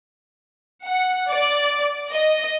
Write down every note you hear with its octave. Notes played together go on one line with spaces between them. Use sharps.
F#5
D5
D#5